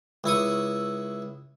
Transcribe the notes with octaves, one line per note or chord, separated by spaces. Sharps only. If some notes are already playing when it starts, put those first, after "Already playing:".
C#2 E4 C#6 D#6